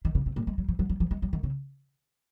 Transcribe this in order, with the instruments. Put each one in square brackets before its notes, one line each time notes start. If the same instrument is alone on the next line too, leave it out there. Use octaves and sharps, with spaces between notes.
[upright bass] D#3
C#3
C3
A#2
G#3
F#3
F3
F#3
F#3
F3
G#3
F#3
D#3
C#3